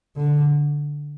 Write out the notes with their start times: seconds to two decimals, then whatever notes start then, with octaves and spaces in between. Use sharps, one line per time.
0.17 D3